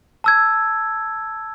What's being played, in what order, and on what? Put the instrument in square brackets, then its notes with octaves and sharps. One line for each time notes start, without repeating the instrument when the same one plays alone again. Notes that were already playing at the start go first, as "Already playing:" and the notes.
[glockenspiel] A5 E6 G#6